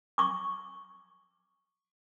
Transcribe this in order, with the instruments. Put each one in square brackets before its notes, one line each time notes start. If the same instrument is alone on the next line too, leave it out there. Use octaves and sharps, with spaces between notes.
[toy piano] C#6 D6